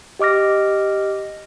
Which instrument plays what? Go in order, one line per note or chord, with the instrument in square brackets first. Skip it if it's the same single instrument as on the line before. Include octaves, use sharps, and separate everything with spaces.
[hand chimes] G4 D#5 D6 F6 A#6